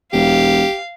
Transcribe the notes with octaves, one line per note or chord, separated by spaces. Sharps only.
E1 G4 F5